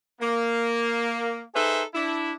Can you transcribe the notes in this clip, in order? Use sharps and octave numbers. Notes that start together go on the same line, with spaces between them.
A#3
D#4 G#4 A4 B4 C5 E5
D4 E4